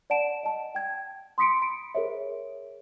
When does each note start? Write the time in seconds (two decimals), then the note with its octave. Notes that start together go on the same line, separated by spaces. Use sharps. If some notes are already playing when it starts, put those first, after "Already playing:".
0.10 D5 F#5 A5 D7 E7
0.43 D#5 A5
0.75 G5 G#6
1.38 C6 D#6 B6 C#7 D7
1.62 B5 D7
1.95 G#4 A#4 C5 C#5 E5